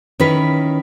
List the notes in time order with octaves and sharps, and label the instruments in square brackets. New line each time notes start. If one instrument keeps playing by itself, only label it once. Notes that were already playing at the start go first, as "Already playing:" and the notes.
[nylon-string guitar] D#3 C#4 E4 B4